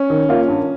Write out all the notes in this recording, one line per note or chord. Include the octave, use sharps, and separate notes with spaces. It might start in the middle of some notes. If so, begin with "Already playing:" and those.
Already playing: C#4
D#3
A#3 F4
G2